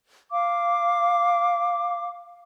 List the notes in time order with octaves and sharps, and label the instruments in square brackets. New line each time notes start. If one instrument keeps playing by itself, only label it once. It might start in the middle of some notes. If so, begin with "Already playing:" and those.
[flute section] F5 D6